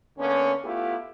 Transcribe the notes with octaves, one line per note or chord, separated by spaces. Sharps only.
D3 A#3 B3 C#4
A3 B3 E4 F4 G4